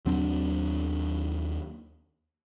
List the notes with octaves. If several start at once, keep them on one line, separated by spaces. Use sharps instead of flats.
D#2 F#3 C4 D4